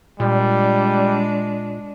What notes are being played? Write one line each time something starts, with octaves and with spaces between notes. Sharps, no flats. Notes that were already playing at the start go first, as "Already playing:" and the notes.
A#2 G3 G#3 D4